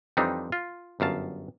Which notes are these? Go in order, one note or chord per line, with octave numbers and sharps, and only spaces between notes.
F2 E3 G3 C4 D4 D#4
F4
G1 F#2 F5 A5